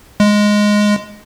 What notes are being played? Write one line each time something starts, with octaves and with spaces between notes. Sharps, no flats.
G#3